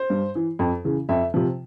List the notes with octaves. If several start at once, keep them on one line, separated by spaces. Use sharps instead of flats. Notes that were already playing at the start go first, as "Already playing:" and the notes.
Already playing: C5
G2
E3
F2
C#3 E3
F2 E5
C3 F3